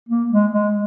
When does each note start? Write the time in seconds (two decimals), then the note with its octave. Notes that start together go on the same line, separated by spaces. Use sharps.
0.09 A#3
0.31 G#3
0.53 G#3